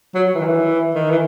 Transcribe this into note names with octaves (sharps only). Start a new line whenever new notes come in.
F#3
E3
D#3
E3
D#3
E3